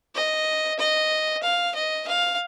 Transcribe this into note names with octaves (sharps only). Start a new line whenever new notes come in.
D#5
D#5
F5
D#5
F5